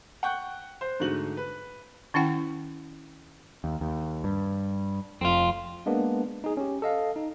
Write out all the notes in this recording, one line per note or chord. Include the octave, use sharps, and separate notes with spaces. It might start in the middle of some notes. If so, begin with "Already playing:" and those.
F#5 G5 C#6 F#6 G6
C5
G#2 D3 A3 F#4 F#7
B4
D#3 C#4 E4 F#5 G5
D#2
D#2
G2
F1 F2 C4 F4
G#3 A#3 B3 D4
D#4 G#4
C#4 G4
A4 D#5 F5
D#4